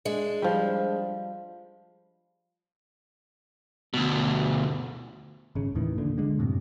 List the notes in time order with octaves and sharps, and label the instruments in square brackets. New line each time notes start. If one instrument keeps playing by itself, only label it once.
[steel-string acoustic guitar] G#3 D4
[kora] F3 G3
[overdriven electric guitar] D2 B2
[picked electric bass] G#1 C#3
D#2 A2 D#3 E3
A#1 A#2 D3
D3 G#3
F#2 A2 C3